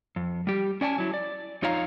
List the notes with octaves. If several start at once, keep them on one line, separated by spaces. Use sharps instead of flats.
F2
G3 G4
C#4 D5 G#5 A5
F#3 E4
D5
F2 D#4 F4 C#5 F5 A#5